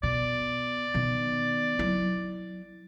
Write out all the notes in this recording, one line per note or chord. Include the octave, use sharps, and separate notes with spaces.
B2 D5
B2 D#3
F#3 E4